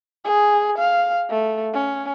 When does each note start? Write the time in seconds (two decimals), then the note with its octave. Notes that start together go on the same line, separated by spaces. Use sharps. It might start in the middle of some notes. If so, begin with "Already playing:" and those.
0.25 G#4
0.78 F5
1.30 A3
1.73 C#4